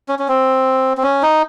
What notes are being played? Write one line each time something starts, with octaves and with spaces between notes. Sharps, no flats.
C#4
C#4
C4
C4
C#4
D#4